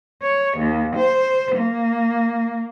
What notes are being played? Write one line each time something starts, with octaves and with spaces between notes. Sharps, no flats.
C#5
D#2
C5
A#3